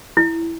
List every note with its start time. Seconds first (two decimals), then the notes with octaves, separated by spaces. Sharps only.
0.17 E4